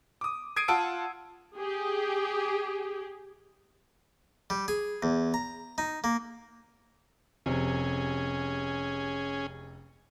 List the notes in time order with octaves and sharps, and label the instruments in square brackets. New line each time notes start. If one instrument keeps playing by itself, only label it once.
[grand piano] D6 D#6
D#6 G#6 C7 D7 D#7
F4 F#5 A5 E6 D7
[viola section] G4 G#4
[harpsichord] G3
G#4
E2
A#5
D#4
A#3
[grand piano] F1 C3 [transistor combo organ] C#4 G#4